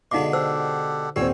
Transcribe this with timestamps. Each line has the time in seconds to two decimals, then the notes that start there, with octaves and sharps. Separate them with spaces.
0.11 B2 D3 G#3 D#4 F5 D6
0.33 G4 A4 C5 F#5 E6
1.16 D#1 G3 C4 G4 C#5 E6